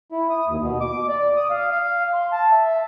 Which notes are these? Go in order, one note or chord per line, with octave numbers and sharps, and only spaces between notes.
E4
D#6
D#2
B2
D6
D5
D#6
F5
F5
C6
A5
E5